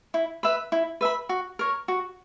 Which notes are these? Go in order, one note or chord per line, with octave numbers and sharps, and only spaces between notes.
E4
B4 E5 B5
E4
B4 E5 B5
F#4
A#4 C#5
F#4